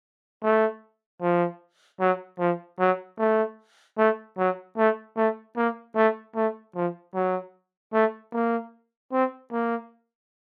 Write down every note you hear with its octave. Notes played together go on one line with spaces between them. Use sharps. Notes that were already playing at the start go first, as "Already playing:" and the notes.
A3
F3
F#3
F3
F#3
A3
A3
F#3
A3
A3
A#3
A3
A3
F3
F#3
A3
A#3
C4
A#3